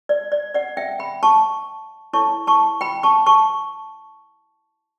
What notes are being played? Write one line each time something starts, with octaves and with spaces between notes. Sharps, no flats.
D5
D5
D5 F#5
E5 G5
G5 B5
A5 C#6
E4 A4 C#5 A5 C#6
A5 C#6
G5 B5
A5 C#6
A5 C#6